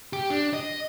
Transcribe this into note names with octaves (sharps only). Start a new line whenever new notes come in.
G4
D4
D#5